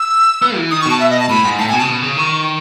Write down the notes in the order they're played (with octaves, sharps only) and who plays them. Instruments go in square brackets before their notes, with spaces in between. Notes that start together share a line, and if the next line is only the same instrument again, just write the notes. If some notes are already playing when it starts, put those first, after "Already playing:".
Already playing: [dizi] E6
[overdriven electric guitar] B3
E3
[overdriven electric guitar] D#3 [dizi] D#6
[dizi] C#6
[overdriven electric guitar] B2
[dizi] A5
E5
D#5
A5
[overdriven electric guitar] A2 [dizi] B5
[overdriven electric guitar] G#2
[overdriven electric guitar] A2 [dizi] A5
[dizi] G#5
[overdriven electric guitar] B2
[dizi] A5
[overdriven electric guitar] C#3
B2
C#3
[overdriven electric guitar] D#3 [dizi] C#6